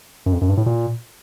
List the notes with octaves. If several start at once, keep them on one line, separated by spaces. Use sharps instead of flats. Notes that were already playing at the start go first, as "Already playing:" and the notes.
F#2
F2
F#2
G2
A2
A#2